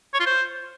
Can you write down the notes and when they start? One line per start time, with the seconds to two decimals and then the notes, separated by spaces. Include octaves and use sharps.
0.14 C#5
0.20 F4
0.26 C5